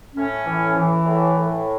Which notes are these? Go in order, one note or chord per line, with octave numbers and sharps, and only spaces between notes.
A2 C#4
E3
E3
A2
A2